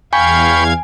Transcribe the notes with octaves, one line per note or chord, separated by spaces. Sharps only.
E2 F5 G5 G#5 B5 C#6 G#6